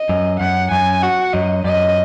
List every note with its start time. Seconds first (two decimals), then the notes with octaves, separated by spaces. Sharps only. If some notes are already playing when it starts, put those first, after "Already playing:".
Already playing: D#5
0.09 F#2
0.40 F#2 F#5
0.72 F#2 G#5
1.02 F#4 F#5
1.33 F#2 D#5
1.64 F#2 D#5